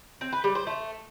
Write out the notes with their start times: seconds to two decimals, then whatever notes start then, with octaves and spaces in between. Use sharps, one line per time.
0.21 C4
0.32 B4
0.44 G3
0.55 C5
0.67 A3